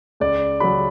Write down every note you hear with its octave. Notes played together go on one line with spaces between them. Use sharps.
C#2 D5
C#3 F#3 B5